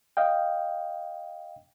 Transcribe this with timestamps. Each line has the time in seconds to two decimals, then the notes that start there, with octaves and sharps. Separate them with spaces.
0.17 D#5 F5 G5